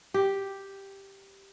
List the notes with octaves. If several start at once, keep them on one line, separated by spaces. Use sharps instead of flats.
G4